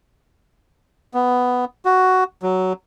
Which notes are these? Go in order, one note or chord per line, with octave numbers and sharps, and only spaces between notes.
B3
F#4
F#3